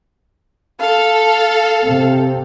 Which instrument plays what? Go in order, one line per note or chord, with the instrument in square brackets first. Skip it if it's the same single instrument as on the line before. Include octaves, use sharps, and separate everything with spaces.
[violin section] A4 [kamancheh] F5
[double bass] C3 C4